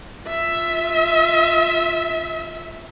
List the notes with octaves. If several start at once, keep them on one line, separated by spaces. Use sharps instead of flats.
F4 E5